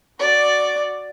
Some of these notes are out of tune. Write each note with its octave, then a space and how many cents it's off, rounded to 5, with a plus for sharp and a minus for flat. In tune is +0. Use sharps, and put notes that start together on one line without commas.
F#4 +0 D5 +0